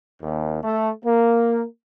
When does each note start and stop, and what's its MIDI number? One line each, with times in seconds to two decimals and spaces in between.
0.22 0.59 39
0.63 0.90 57
1.04 1.64 58